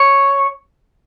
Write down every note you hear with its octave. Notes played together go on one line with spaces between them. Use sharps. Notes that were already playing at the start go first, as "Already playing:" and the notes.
Already playing: C#5